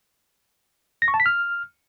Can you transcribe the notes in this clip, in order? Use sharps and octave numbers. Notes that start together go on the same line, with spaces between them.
A#6
C#6
A5
B6
F6